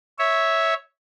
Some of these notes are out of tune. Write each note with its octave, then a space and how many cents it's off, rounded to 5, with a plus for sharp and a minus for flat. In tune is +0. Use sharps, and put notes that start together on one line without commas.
C#5 +0 E5 -10